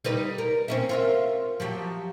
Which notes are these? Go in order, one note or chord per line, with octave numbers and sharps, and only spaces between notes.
G3 D#4 B4
A#4
C4 C#4 E5
F4 A#4 E5
F3 F#3 G4